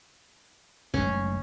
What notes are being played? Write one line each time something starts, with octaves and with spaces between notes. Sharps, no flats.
F#1 G#3 A3 C#4